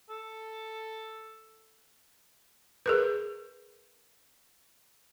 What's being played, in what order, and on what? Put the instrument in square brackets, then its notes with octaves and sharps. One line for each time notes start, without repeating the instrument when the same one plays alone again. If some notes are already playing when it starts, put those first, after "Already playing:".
[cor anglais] A4
[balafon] G#4 A#4 B4